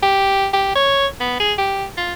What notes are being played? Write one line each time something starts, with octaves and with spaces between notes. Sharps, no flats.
G4
G4
C#5
B3
G#4
G4
F4